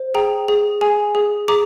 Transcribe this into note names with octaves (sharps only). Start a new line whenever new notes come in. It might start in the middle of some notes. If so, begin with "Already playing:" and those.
Already playing: C5
G#4 G5 A#5
G#4
G#4 G#5
G#4
G#4 A#5 D6